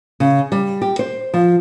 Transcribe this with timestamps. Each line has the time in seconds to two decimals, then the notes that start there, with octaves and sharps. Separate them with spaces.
0.20 C#3
0.52 G3
0.82 G4
0.99 C5
1.34 F3